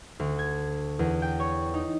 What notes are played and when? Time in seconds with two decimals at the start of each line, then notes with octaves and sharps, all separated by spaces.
0.19 D2
0.39 G#6
0.99 E2
1.22 G5
1.40 C#5
1.74 D#4